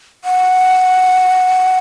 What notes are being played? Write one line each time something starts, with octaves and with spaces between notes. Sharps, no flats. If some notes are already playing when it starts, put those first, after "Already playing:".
F#5